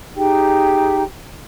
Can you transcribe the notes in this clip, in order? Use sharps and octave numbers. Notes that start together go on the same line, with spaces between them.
D#4 G4 G#4 G5